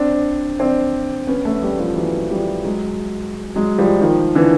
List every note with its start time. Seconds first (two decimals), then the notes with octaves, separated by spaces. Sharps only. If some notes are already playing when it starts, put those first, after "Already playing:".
Already playing: C4 D4
0.59 C4 D4
1.27 B3 C#4
1.45 A3 B3
1.62 G3 A3
1.79 F3 G3
1.96 E3 F#3
2.31 F3 G3
2.64 F#3 G#3
3.56 F#3 G#3
3.78 F3 G3
4.01 D#3 F3
4.35 D3 E3